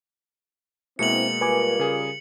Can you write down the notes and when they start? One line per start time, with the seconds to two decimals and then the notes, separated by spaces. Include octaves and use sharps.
0.99 B2 G#3 A#3 C4 E4 C#7 F#7
1.41 G3 F4 A#4 B4 G#5 D6
1.79 C#3 G#4